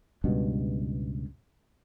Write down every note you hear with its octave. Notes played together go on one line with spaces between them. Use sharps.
C#2 G2 B2